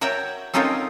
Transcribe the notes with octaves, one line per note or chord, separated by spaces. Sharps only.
F#4 A#4 C#5 E5 G5
C4 C#4 D#4 F4 A4 A#4